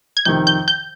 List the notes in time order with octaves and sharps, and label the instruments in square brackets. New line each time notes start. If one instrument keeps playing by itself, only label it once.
[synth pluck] G#6
[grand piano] F2 C3 D#3 [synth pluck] G6
[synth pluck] G6
G6